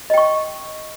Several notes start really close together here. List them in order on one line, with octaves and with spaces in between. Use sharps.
D#5 G5 C#6